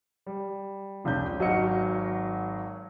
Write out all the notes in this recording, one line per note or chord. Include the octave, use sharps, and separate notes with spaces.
G3
F1 C#2 C#3 D4 G6
G#1 F#3 D#5 F5 C#7